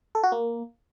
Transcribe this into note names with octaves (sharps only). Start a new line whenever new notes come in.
A4
F#4
A#3